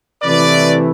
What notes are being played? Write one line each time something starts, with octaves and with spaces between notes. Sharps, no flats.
C3 E3 A3 E4 B4 D5